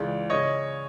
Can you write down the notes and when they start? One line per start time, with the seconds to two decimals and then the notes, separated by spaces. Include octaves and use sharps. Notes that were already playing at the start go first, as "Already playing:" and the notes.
Already playing: C#2 C#3 E3 D5
0.30 C#3 C#5 D#5